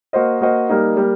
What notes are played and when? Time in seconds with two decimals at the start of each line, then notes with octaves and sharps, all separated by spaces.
0.13 A#3 F#4 C5 D#5
0.41 A#3 F#4 C5 D#5
0.69 G3 A#3 D#4
0.97 G3 A#3